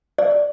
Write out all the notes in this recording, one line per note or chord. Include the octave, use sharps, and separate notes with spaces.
D5